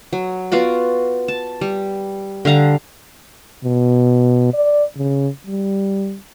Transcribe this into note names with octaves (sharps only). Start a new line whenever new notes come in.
F#3
B3 F4 F#4 D5
A5
G3
D3 G3 F5 A#5
B2
D5
C#3
G3